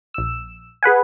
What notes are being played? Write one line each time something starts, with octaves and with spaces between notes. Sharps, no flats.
A#1 E6
G#4 B4 F#5 G#5